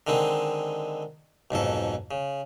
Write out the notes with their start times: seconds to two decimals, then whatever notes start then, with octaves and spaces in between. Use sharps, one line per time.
0.07 D3 D#3 G#3 C4
1.51 B1 F2 G#2 A4
2.11 C#3